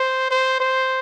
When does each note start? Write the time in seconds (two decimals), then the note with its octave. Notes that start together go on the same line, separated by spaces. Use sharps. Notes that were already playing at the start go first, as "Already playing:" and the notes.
Already playing: C5
0.31 C5
0.60 C5